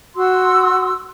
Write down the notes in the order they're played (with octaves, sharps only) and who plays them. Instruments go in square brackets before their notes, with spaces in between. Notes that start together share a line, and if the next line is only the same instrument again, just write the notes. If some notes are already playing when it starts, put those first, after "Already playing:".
[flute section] F#4 C6 E6